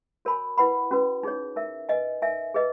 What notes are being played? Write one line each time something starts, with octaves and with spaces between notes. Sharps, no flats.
F#4 A#4 C#5 G#5 B5
E4 B4 F#5 B5
C#4 F#4 B4
D#4 G#4 C#5
D#4 A#4 E5
B4 D#5 G#5
D#4 A#4 E5 G#5
G#4 B4 D#5